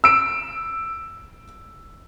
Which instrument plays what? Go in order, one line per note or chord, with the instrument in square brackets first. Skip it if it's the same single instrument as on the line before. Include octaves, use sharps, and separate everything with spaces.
[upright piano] E6 D7